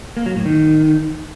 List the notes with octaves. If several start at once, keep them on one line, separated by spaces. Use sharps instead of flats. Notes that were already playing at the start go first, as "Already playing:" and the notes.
A#3
F#3
A2
D#3